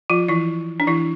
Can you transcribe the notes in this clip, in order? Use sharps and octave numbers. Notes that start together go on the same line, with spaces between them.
F3 F4
E3 E4
D4
E3 E4